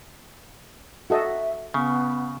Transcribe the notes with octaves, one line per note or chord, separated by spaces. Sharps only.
F#4 A4 D#5 E5
C#3 B3